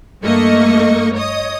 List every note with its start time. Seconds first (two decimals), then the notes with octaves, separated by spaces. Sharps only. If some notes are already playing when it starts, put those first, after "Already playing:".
0.21 G2 A3 A#3 D#5 C#6
1.14 C#5 D#5 D#6